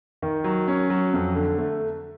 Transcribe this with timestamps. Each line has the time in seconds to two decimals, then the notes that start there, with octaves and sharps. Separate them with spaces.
0.22 D#3
0.44 F#3
0.67 C#4
0.90 F#3
1.13 F2
1.35 D3
1.58 A3